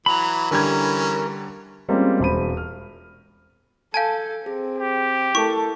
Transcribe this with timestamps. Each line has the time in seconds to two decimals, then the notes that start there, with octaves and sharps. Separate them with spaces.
0.06 E3 F#3 A#5 B5
0.51 D3 E3 G3 C#4 A#4 G#6
1.89 G3 G#3 A#3 C4 C#4 F4
2.20 E1 C5 B5 D#7
2.57 F6
3.94 A4 F5 G#5 A5 G6 G#6
4.46 C4 G#4
4.78 G4
5.35 A3 E4 A4 A#4 A5 C#6